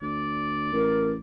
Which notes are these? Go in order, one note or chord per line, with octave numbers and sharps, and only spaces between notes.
D2 D5
A1 A#4